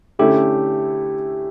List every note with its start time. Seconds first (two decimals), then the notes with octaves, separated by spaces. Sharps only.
0.19 D3 A3 C#4 E4 G4